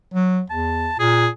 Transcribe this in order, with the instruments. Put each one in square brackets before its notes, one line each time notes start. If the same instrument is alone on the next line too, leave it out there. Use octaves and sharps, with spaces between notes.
[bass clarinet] F#3
[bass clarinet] E2 [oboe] A5
[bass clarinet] A#2 [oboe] G#4